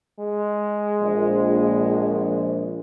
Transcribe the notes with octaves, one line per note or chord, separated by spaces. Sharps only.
G#3
A#1